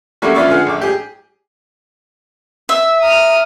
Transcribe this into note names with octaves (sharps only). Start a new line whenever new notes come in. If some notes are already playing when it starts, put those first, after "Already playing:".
E3 G3 A3 A#3 C#4 F#4
C#4 F4 B4 D5 E5 C#6
D2 F4 G#4 F#5
A1 D6
G4 G#4
E5 E6
A#5 D#6 F6